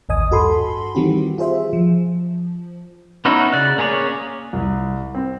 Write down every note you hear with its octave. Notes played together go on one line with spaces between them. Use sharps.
A1 D#2 D#5 G#5 D#6
G2 F#4 A4 B5 C6
D#3 E3 G3 C4 F#4 G4
F4 G#4 C5 E5
F3
B3 C#4 D#4 E4 F#4
C#3 D5 F#6
A#3 C#4 G#4 C#5 D5
C2
C4